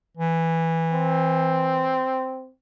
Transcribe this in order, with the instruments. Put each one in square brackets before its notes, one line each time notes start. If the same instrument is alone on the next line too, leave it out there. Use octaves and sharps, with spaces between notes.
[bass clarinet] E3
[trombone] C4